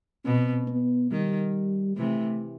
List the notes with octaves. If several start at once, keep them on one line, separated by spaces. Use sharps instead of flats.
B2 C4
B3
D#3 G3
C3 E3 A3